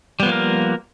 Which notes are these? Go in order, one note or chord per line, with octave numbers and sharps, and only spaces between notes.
F3 G3 A#3 B3 A#4